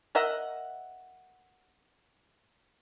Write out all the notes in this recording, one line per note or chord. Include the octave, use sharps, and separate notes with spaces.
A#4 D#5 E5 F#5